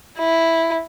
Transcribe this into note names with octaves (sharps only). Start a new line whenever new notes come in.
E4